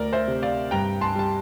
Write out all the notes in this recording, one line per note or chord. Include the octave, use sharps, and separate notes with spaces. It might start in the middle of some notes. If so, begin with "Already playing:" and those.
Already playing: D2 A#4 D5
C5 E5
C3
D5 F5
G2 G5 A#5
A5 C6
G3 A5